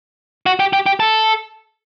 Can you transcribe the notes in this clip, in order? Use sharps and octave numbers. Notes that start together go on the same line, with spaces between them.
F#4
G4
G4
G4
A4